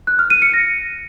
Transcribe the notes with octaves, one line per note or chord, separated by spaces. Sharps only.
F#6
F6
D#7
C#7
A#6